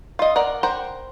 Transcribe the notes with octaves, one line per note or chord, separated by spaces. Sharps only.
F4 D#5
A#4 D5 F#5
A#4 C5 F#5 G5